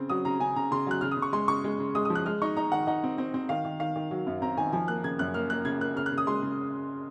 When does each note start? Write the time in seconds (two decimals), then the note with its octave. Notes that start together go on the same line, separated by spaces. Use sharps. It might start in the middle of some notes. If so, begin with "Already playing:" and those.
Already playing: C#3 C4
0.09 F#3 D#6
0.25 C#3 A#5
0.40 C#3 G#5
0.56 C#3 A#5
0.71 C#3 C6
0.87 F#3 F#6
1.01 C#3 F6
1.11 D#6
1.17 C#3
1.22 C#6
1.33 G#3 C6
1.48 C#3 C#6
1.64 G#3
1.80 C#3
1.95 G#3 D#6
2.05 D#6
2.10 F3
2.15 F#6
2.26 G#3 F6
2.42 D#4 C#6
2.57 D#4 A#5
2.72 D#3 F#5
2.87 D#4 F#5
3.04 C4
3.18 C4
3.34 C4
3.49 D#3 F5
3.65 D#3
3.80 D#3 F5
3.96 D#3
4.11 F#3
4.27 F#2
4.42 C4 A#5
4.57 D#3 G#5
4.72 F3 G#5
4.88 A#3 F#6
5.03 C#3 G#6
5.19 F#2 F#6
5.34 A#3 F6
5.50 A#3 F#6
5.65 C#3 G#6
5.81 A#3 F#6
5.96 C#3 F6
6.06 F#6
6.12 C#3
6.18 D#6
6.27 G#3 C6
6.42 C#3